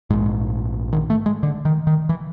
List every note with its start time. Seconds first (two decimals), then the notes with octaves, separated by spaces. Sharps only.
0.10 A#1 G#2 G#3
0.93 D#3
1.10 A3
1.26 G#3
1.43 D3
1.65 D#3
1.87 D#3
2.09 E3